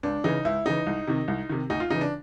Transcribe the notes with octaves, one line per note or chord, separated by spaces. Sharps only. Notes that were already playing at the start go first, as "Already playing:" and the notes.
C#2 D4
C#3 E3 D#4
C#2 E4
C#3 E3 D#4
C2
C3 D#3
C2
C3 D#3
D2 D#4
F4
C#3 E3 D#4
D4